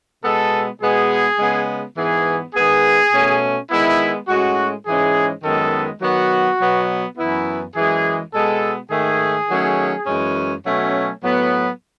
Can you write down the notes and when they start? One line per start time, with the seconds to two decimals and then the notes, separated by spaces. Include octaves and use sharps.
0.23 B2 G#3 B3 A4
0.81 B2 G#3 B3 G#4
1.39 C#3 G#3 B3
1.97 G#2 E3 B3 G#4
2.54 D#3 G#3 B3 G#4
3.12 B2 A3 C#4
3.70 D#3 G#3 B3 E4
4.28 A2 G#3 C#4 F#4
4.86 G#2 E3 G#3 C#4 G#4
5.43 F#2 D#3 G#3 B3 A4
6.02 D#3 F#3 B3 F#4
6.59 B2 F#3 B3
7.17 F#2 E3 B3 E4
7.76 F#2 E3 G#3 G#4
8.33 B2 G#3 B3 A4
8.91 G#2 D#3 A3 G#4
9.49 D#3 F#3 A3 C#4
10.06 F#2 E3 G#3 C#4
10.65 B2 F#3 A3 C#4
11.23 A2 F#3 B3